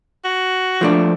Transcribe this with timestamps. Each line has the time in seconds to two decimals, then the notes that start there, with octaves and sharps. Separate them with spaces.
0.24 F#4
0.81 F3 A3 D4